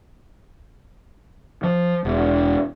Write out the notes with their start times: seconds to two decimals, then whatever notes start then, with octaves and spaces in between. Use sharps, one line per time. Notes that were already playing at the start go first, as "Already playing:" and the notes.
1.63 F3
2.05 E1